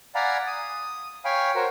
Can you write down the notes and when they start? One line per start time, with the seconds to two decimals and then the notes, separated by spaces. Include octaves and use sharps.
0.15 D5 F5 F#5 G#5 A#5 B5
0.47 D#6
1.25 C#5 F5 G5 G#5 B5
1.55 F#4 A#4 C5 C#5